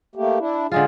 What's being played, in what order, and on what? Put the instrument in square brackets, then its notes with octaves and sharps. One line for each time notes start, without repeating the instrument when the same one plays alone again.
[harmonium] A3 A#3 G4
D4 E4
[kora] D3 G#3 F4 [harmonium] G#4